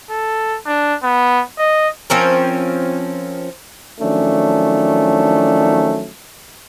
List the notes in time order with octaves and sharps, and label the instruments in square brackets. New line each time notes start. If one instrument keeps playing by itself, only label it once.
[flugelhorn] A4
D4
B3
D#5
[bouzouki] F3 C4 C#4 A#4
[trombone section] D#3 F3 F#3 A3 C#4 D4